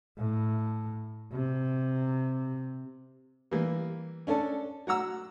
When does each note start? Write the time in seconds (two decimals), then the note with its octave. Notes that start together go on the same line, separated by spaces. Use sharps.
0.19 A2
1.32 C3
3.51 E3 G3 A#3
4.27 C#4 D4 A4 A5
4.87 F#3 F#5 A#5 E6